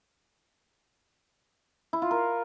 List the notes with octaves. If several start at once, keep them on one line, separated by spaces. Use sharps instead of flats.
E4
F4
A#4